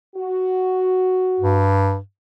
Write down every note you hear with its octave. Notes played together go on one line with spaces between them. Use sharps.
F#4
G2